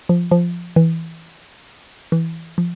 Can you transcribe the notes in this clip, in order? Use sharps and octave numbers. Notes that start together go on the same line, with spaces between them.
F3
F3
E3
E3
F3